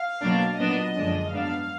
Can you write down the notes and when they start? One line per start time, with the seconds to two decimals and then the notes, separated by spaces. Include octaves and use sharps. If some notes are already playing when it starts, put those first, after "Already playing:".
Already playing: F5
0.22 B2 F#3 A#3 D4
0.58 A#2 F#3 B3 D4 D#5
0.96 F#2 D3 F3 G#3 D4
1.32 G#2 F#3 B3 D4 F5